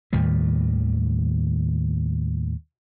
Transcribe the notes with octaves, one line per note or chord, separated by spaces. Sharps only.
D#2 A2 D#3 G3